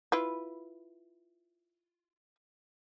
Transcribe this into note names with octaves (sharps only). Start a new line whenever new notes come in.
E4 F4 B4